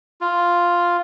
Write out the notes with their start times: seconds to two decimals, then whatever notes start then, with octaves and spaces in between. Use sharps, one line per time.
0.21 F4